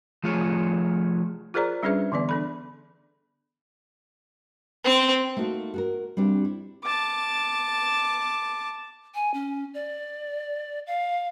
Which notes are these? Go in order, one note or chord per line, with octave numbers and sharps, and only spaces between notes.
F3 A3 F4 G#4 C#5
F4 G#4 A#4 C5 D5 A#5
G3 C#4 D4 G#4 B4 E5
D3 E3 B3 D5
D4 A4 B5
C4
A3 A#3 D#4 F#4 A4
F#4 A4 A#4
G3 C4 D4 G4
E4
A5 D6
G#5
C#4
D5
F5